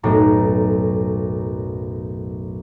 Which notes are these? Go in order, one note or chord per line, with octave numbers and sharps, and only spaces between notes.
B1 F#2 A2 A#5